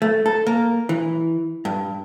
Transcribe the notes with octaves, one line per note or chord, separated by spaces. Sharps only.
A3
A4
A#3
E3
G2